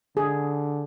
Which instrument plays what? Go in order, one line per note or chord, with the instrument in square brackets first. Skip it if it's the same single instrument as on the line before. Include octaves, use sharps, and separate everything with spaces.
[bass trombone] D3 [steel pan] G#4